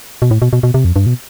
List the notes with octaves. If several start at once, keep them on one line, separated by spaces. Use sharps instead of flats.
B2
A2
B2
B2
B2
C3
F2
G2
B2